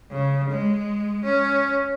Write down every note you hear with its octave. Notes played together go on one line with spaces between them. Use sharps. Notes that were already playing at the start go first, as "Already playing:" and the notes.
C#3
G#3
C#4